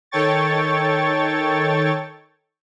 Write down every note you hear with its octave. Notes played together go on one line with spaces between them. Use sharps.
D#3 A4 C#5 G5 C#6 A6